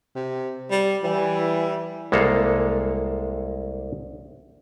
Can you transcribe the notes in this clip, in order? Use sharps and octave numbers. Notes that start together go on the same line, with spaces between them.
C3
G3
E3 G3
C2 G#3 A#3 A4 F5